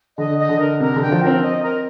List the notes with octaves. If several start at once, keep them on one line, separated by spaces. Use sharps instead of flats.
D3 D#5
D#5
D3
A#4
C3 A#4
D3 G5
F3
C4 A#4
C4 D#5
A#4